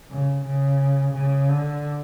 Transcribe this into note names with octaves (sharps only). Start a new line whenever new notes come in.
C#3
C#3
C#3
D3